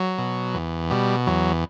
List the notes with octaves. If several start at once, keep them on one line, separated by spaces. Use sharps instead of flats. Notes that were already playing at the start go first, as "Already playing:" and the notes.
Already playing: F#3
B2
E2
B2 G3
E2 F#3